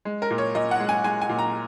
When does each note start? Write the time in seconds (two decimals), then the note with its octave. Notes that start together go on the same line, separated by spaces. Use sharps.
0.05 G#3
0.22 A#4
0.30 A#2
0.38 C#5
0.55 A#2 D#5
0.71 F#5
0.80 G#3
0.89 G#5
1.04 G#3 G#5
1.22 G#5
1.29 A#2
1.39 A#5